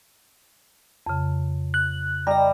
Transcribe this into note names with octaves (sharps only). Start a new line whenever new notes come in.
F2 C#3
F#6
G3 D#5 A#5